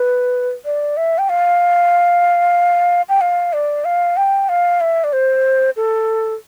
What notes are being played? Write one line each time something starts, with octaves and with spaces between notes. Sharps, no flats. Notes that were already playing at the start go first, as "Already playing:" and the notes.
Already playing: B4
D5
E5
G5
F5
G5
F5
D5
F5
G5
F5
E5
D5
C5
A4